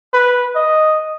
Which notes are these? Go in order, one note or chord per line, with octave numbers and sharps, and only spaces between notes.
B4
D#5